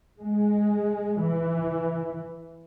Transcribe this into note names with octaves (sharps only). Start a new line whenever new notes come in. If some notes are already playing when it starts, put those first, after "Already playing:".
G#3
E3